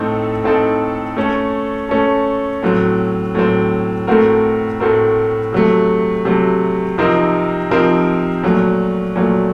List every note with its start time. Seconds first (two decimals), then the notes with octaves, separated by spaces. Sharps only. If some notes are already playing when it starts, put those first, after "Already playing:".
Already playing: A2 A3 C4 D#4 A4
0.44 A2 A3 C4 D#4 A4
1.17 A3 C#4 A4
1.89 A3 C#4 A4
2.63 A2 F#3 C4
3.35 A2 F#3 C4
4.07 A2 A3 C4 F#4 A#4
4.80 A2 A3 C4 F#4 A#4
5.53 C3 F#3 A3
6.25 C3 F#3 A3
6.98 C3 F3 C4 D#4 A#4
7.70 C3 F3 C4 D#4 A#4
8.43 A#2 F#3 A3
9.16 A#2 F#3 A3